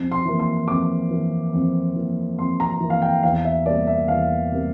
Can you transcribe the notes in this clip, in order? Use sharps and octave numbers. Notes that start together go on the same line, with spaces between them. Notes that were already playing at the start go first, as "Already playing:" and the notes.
Already playing: F2
C6
E3 A#3
C6
F2 D6
E3 A#3
F2
E3 A#3
F2 C6
A#5
E3 A#3
F5
G5
E2 F5
E5
C3 G3 A#3 D5
E5
E2 F5
C3 G3 A#3